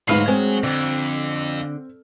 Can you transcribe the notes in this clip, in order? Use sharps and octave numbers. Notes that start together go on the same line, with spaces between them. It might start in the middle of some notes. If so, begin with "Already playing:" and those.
D2 G#2 F#3 B4 F5 F6 C7
G#3 C4
F2 D3